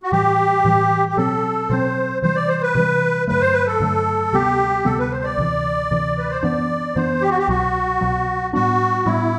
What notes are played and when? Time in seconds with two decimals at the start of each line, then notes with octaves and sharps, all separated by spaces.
0.03 F#4
0.11 A2 E3 G3 G4
0.65 A2 E3 G3
1.09 G4
1.16 B2 F#3 C4 A4
1.70 B2 F#3 C4 C5
2.22 C3 E3 G3 C5
2.35 D5
2.48 C5
2.62 B4
2.75 C3 E3 G3
3.27 G2 D3 F#3 A3 B4
3.41 C5
3.53 B4
3.67 A4
3.80 G2 D3 F#3 A3
4.33 D2 C3 G3 B3 G4
4.85 D2 C3 G3 B3 A4
4.99 B4
5.12 C5
5.24 D5
5.38 D2 C3 E3
5.91 D2 C3 E3
6.18 B4
6.30 C5
6.42 F#2 E3 B3 D4 D5
6.95 F#2 E3 B3 D4 C5
7.21 G4
7.30 F#4
7.38 G4
7.48 C2 B2 F#3 F#4
8.01 C2 B2 F#3
8.53 A2 G3 B3 D4 F#4
9.05 A2 G3 B3 D4 E4